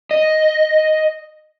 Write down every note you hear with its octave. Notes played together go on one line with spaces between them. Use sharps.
D#5